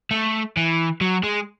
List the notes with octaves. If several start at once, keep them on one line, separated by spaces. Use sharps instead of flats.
A3
E3
F#3
G#3